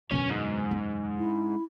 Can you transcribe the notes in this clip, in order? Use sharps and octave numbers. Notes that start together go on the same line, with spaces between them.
E1 F#2 B2 D3 C#4 C#5
G#2
C#4
E4